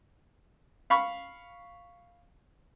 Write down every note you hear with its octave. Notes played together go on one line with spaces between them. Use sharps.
F5 B5 C#6